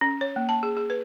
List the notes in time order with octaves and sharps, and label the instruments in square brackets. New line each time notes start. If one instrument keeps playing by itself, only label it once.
[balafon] C#4
C#5
A#3
A5
G#4
G#4
B4